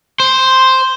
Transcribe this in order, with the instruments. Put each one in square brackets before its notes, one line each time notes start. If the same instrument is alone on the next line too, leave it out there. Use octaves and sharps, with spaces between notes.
[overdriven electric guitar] C5